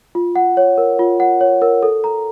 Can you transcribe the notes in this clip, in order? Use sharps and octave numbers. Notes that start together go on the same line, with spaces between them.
F4
F#5
C#5
A#4
F4
F#5
C#5
A#4
A4
A#5